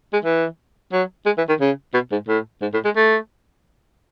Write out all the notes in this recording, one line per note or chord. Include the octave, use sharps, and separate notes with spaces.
G#3
E3
F#3
G#3
E3
D#3
C#3
B2
G#2
A2
G#2
A2
G#3
A3